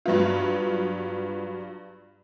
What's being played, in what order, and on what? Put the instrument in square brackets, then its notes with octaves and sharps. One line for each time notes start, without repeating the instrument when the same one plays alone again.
[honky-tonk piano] G2 F#3 B3 F4